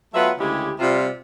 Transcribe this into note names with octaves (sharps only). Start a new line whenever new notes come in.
F#3 A3 B3 F4 B4 E5
D2 C#3 G#3 E4 G4
C3 G3 F4